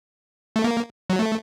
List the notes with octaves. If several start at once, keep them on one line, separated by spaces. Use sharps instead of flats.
A3
A#3
F#3
A3